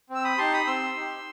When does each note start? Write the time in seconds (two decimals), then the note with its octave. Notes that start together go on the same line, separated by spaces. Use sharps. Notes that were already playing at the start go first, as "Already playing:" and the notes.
0.10 C4 E6
0.24 B5 D#6
0.38 D#4 G4 A5 C6
0.53 B5 D#6
0.67 C4 C6 E6
0.95 D#4
1.00 G4